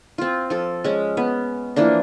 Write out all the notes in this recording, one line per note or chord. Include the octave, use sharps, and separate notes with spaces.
C4 F4
F3 A4
G#3 C#4
B3
E3 F3 A#3 D4